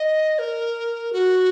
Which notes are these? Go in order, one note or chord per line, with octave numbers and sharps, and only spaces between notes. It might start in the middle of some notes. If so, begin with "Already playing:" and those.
Already playing: D#5
A#4
F#4